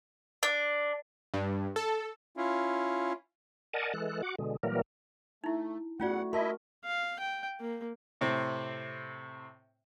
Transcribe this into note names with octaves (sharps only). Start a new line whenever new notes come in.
D4
G2
A4
C#4 E4 F4
A#4 D5 D#5 F#5 G#5 A5
E3 G#3 A4 F#6
F#4 F#5 D6
B2 D3 G#3
A#2 E3 F#3 G3 A#3 A#4
A3 D#4 E4
E2 A3 C#4 F4 F#4 D5 F#5
E4 A#4 D#5 E5 A5 C6
F5
G5
A#3
A2 C3 C4